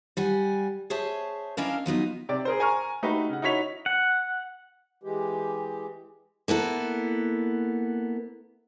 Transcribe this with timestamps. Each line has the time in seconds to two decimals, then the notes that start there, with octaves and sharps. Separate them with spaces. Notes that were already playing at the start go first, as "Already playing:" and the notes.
0.17 G3 F#5 G#5
0.90 G#4 C5 C#5 E5 A5
1.57 C#4 D4 E4 A#4 D#5 F5
1.86 F3 F#3 B3 D#4
2.29 C3 D5
2.45 G#4 A#4 C5
2.60 G#5 A#5 C#6 F6
3.03 A3 D#4 F#4 G4 B4
3.29 C#3 F#5
3.42 D#4 E4 F#4 C#5 B6 F7
3.86 F#5
5.03 E3 G#3 G4
6.48 A#3 B3 E4 A4